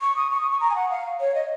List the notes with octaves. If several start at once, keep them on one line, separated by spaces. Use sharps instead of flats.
C#6
D#6
C#6
D#6
C#6
A#5
G#5
F#5
F5
C#5
D#5